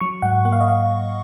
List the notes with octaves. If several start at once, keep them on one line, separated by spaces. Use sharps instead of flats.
F#3 C#6
G#2 F#5
A#3 F#5
F5
D#5
F5